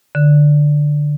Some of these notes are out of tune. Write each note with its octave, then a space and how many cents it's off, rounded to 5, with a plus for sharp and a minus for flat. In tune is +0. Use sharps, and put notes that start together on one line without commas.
D3 +10